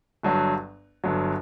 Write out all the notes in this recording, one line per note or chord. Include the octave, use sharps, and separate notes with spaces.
G1 G2 F#3
G1 G2 F#3